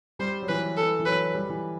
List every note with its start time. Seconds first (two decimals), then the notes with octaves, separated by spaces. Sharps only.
0.19 G3 C5
0.42 F#3
0.48 E3 B4
0.77 A4
0.99 E3
1.06 F#3 B4
1.34 G3
1.49 E3